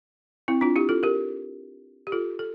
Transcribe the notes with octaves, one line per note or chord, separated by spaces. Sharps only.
C4 E4
D4 F4
E4 G4
F4 A4
G4 A#4
G4
F4 A4
A4